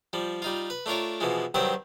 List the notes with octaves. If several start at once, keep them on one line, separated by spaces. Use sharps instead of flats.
F3 G3
G3 D#4 F4
B4
A3 D4 F4 A#4 C#5
B2 E3 F3 G#3
G2 D#3 F#3 C4 G4 C5